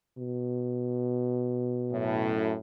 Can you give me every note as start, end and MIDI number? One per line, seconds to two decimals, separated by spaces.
0.17 2.36 47
1.92 2.55 42
1.92 2.55 45